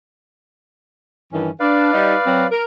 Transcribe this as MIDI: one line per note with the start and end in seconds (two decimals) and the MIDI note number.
1.32 1.49 43
1.32 1.49 51
1.32 1.49 52
1.32 1.51 61
1.60 1.91 62
1.60 2.47 71
1.60 2.47 74
1.60 2.47 77
1.92 2.14 55
1.92 2.14 63
2.25 2.44 54
2.25 2.44 60
2.51 2.64 70